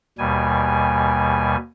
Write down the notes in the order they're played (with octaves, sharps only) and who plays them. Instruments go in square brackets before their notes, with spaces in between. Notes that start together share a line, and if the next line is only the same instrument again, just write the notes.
[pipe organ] D#2 B2 G3 G#5